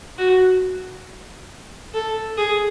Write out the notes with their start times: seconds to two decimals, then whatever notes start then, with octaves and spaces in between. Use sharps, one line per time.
0.18 F#4
1.94 A4
2.37 G#4